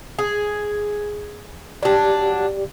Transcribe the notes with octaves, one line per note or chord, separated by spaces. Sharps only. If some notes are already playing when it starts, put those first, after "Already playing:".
G#4
F#3 D4 G4 D5